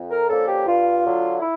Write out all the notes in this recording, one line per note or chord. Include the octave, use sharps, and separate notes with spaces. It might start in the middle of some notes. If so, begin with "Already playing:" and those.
Already playing: F2
A#4
D3 F3 A#3 C#4 A4
G4
G2 F4
D3 F#3
E4